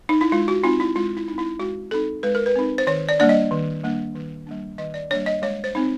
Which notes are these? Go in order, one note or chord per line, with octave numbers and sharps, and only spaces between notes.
D#4
E4
G#3 F4
F#4
C4 D#4 F4
E4
G#3 F4
E4
C4 D#4
E4
G#3 F#4
C4 D#4 A4
G#3 B4
A#4
B4
C4 D#4
C5
D#3 C#5
D5
G3 A#3 D4 D5
D#5
D#3
G3 A#3 D4
D#3
G3 A#3 D4
D#3 D#5
D5
G3 A#3 D4 C#5
D#5
G#3 C#5
C5
C4 D#4